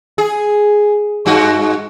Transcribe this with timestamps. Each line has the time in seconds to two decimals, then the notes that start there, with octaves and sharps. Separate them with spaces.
0.18 G#4
1.26 G2 G#3 F#4